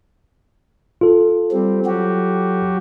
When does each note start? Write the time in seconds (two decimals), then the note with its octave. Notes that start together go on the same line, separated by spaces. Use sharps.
1.01 F4 A4
1.52 G3 C4
1.86 F#3 F#4 G4